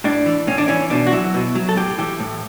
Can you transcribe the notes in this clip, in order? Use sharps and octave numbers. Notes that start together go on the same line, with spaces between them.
A2 D4
E3
A2 C#4
D4
E3 C#4
B2 D4
F#4
F#3 E4
B2
F#3
A4
A2 G4
E3 G4
A2